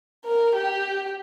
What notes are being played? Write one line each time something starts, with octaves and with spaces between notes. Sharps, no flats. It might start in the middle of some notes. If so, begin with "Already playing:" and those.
A#4
G4